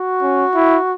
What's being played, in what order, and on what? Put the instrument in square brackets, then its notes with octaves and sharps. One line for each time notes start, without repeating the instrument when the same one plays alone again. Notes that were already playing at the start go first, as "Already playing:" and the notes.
Already playing: [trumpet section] F#4
[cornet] C#4
E4